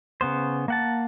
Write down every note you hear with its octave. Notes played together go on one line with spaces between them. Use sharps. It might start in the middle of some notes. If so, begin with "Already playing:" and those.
C#3 B3 C5
A#3 F#5 A5